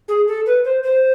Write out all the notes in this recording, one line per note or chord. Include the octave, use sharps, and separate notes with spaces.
G#4
A4
B4
C5
C5